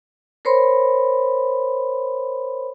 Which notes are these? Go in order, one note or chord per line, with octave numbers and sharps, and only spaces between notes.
A#4 C5 C#5 B5 C6